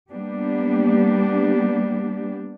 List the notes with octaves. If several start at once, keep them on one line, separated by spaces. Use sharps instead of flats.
G3 A#3 B3 D4 G4